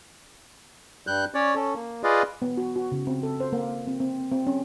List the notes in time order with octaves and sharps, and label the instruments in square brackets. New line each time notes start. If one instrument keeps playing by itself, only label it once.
[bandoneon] G2 G3 F#6 G6
C#4 C#5 D5
C#4 A4
A#3
F4 G#4 B4 D5 D#5 F5
[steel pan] B3
F#4
F#4
C#3
C4
A4
C5
A#3
C4
C4
C4
C#4